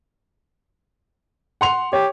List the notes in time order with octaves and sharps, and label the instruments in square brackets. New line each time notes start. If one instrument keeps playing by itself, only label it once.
[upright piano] F#5 C6 F7
[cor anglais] G4 [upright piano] C#5